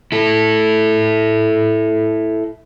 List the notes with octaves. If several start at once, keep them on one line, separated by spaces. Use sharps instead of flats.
E4 A4